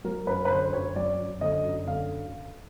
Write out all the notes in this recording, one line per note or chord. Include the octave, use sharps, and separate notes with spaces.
F#3 A#4
F#2 B4
B4
D3 C5
F#2 C#5
F#3 D5
F#2
D3 D#5
F#2
D3 F5